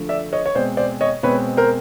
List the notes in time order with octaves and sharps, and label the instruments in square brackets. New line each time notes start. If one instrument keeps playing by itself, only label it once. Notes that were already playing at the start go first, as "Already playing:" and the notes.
Already playing: [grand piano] D3 F3 A3
D5 E5
C#5 D#5
C#5
B2 G#3 C4 C5 D5
C5 D5
C#5 D#5
B2 G#3 C4 B4 C#5
A#4 C5